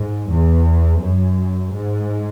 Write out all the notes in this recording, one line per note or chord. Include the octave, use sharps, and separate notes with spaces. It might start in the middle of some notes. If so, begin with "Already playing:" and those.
Already playing: G#2
E2
F#2
G#2